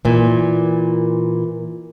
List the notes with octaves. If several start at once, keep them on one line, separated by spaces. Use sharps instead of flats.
A#2 E3